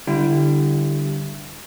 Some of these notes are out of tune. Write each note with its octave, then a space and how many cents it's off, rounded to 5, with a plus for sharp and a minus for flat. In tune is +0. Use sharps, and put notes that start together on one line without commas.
D3 +0 G3 +0 E4 +25